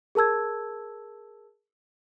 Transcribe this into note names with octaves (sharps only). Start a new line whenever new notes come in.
G#4 A#4 A5 E6 G#6